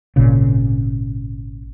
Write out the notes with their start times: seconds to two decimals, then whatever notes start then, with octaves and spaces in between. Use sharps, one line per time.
0.16 G#1 A#2 C#3